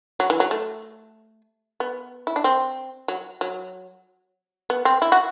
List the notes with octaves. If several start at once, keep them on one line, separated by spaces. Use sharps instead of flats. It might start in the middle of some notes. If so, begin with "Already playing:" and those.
F#3
E3
F#3
A3
B3
E4
D4
C4
F#3
F#3
B3
C4
E4
F#4